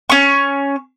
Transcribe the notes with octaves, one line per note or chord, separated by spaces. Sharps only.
C#4 C#6